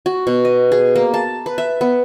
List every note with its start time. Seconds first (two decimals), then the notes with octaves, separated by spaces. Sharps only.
0.06 F#4
0.27 B2
0.45 D#5
0.72 G#4
0.96 A#3
1.14 A5
1.46 B4
1.58 E5
1.81 B3